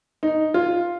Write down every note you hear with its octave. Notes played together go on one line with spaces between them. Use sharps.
D#4
F4